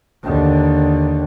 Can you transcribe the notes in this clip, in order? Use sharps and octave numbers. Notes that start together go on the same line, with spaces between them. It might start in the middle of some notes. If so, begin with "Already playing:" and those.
D#2 D3